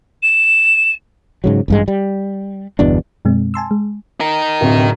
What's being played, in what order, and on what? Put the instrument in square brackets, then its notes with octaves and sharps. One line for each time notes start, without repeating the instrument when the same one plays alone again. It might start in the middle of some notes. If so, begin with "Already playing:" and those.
[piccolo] E7
[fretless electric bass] G#2 C#3 F#3
A1 G2 G#3
G3
G1 E2 B2 D4
[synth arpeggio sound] F#2 B2 G#3 C4
G#5 A5 C6 E6
G#3
[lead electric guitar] D#4 A#4
[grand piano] D1 C3